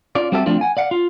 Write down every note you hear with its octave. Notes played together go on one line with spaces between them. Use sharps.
C#4 F4 D5
G3 C4 F#4 G4 A4 E5
F3 A3 C4 D4 F4
F#5 G#5
D5 F5 F#5
F4